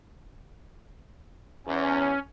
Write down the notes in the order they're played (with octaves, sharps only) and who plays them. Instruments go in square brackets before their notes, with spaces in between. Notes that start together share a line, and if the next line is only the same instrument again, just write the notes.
[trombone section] E2 [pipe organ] C#4